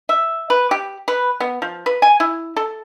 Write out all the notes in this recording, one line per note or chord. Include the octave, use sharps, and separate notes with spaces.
E5
B4
G4
B4
B3
F3
B4
G#5
E4
A4